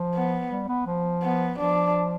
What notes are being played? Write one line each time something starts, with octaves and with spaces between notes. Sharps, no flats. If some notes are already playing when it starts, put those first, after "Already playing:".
Already playing: F3
B3
G3
B3
F3
B3
F3 D4